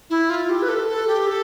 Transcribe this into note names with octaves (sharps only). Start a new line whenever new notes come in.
E4
F4
G4
B4
A4
A4
G4
A4